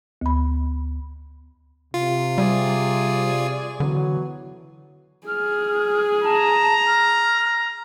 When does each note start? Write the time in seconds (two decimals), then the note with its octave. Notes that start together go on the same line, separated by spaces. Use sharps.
0.21 D2 B5
1.94 C3 F4
2.38 G3 G#4 D5
3.80 D3 E3 F#3 B3
5.27 G#4 F6
6.24 A5 A#5
6.87 F6